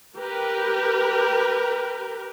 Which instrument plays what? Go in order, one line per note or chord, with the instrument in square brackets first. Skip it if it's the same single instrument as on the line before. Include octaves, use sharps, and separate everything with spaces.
[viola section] G4 A#4 B4